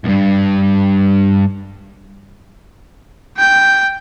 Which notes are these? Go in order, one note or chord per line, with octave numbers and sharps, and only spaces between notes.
C2 G2
G5 G6